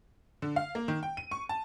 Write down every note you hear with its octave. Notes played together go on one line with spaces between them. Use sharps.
D3
F5
A#3
D#3
G5
D#7
C#6
A5